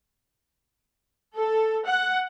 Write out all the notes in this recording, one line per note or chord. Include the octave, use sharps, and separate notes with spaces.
A4
F#5